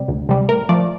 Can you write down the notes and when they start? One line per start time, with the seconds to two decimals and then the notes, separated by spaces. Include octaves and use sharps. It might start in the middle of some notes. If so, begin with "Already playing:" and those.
Already playing: C3 G3
0.08 D2
0.29 C3 G3
0.49 A2 A#4
0.69 F3 A3 D5